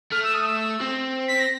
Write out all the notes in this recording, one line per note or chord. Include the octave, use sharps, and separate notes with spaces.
A3 F6
E6
D#6
E6
C4
B6
A#6